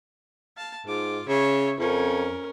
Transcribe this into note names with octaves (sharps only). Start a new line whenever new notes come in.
F5 A5
G#2 F4 D6
C#3 C#5 E5
F2 C#4 A#4